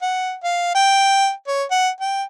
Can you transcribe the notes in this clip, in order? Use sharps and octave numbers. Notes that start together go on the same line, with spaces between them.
F#5
F5
G5
C#5
F#5
G5